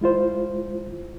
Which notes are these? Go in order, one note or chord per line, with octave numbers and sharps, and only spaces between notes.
G#3 E4 F4 C5